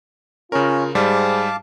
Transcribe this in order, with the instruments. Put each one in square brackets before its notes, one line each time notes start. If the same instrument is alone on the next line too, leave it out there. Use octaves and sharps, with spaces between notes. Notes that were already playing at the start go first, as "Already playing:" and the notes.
[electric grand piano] C#3 A#4 [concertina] C#4 C#5 [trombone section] F4
[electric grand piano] G#2 G3 [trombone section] G#4 C5 [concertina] F5 A5 D6